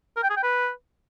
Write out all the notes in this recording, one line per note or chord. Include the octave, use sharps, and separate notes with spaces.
A#4
G5
G#4
G5
B4